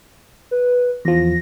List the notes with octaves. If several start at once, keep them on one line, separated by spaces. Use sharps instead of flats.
B4
E2 F3 A#6